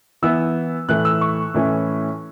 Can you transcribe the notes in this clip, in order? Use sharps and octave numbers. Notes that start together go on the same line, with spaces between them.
E3 B3 E4 E6
A2 E3 A3 F#6
E6
C#6
A2 E3 A3 C#4 E4